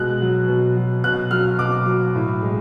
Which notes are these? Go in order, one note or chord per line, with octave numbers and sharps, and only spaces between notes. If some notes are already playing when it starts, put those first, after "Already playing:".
Already playing: B2 G#3 F#6
F#3
B2
F#3
B2 F#6
F#3 F6
B2 D6
F#3
A2
G#3